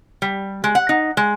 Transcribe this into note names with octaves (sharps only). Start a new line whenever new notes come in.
G3
G#3
F#5
D#4
G#3